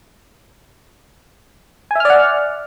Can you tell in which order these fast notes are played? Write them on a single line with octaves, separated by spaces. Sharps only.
G#5 E5 F6 D5 F#5